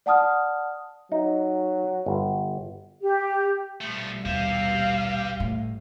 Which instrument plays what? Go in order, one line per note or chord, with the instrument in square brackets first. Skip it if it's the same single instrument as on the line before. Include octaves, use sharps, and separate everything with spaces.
[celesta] D5 F#5 A5 D#6 F6
[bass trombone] F#3 [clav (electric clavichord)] D#4
[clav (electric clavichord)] G1
[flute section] G4
[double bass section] A#1 B2 G3 [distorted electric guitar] F3 A3
[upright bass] D#2 [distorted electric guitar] G4 E5 [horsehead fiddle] F5
[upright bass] A2